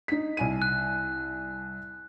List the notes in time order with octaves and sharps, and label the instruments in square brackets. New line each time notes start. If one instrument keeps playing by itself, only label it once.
[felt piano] D#4 B6
C2 G#5 D#7
[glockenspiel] F#6